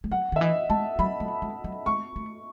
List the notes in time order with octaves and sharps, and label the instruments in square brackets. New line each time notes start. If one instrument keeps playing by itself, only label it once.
[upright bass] G#3
[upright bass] F#3 [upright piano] F#5
[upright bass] D#3
[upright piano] E5
[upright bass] E3 [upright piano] D#5
[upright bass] G#3 [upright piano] A5
[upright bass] F#3 [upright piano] B5
[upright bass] F#3
G#3
F#3
[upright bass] G#3 [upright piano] C#6
[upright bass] A3